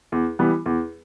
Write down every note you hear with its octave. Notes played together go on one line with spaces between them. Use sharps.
E2
E3 G3 B3
E2